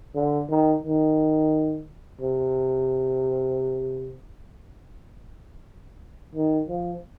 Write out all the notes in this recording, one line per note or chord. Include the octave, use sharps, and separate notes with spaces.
D3
D#3
D#3
C3
D#3
F3